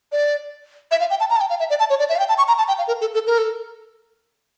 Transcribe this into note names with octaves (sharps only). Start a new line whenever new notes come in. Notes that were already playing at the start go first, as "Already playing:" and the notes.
D5
E5
F5
G5
A5
A#5
A5
G5
F5
E5
D5
A5
C#5
D5
E5
F5
G5
A5
C#6
A#5
A5
G5
F5
A#4
A4
A4
A#4
A4